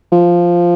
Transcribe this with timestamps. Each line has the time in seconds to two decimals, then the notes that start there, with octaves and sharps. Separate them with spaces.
0.12 F3